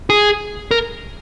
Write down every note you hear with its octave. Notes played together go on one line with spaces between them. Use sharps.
G#4
A#4